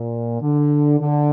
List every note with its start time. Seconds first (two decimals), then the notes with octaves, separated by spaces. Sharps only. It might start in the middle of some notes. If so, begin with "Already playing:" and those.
Already playing: A#2
0.41 D3
1.00 D3